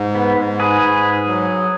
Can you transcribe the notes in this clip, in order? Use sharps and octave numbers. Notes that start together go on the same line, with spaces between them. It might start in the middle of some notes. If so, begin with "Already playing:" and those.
Already playing: G#2
B3
G#2
G#4 B4
G#2
F#3